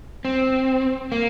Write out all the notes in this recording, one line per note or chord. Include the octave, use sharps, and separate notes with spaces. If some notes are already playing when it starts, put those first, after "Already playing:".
C4
A#3